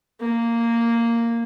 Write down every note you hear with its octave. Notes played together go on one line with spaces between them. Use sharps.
A#3